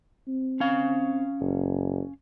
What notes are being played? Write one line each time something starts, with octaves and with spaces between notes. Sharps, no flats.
C4
C#4 F5
F#1